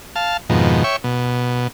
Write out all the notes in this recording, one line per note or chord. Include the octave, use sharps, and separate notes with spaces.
F5 A5
F2 G#2 B2 D#3
C#5 E5 G5 C#6
B2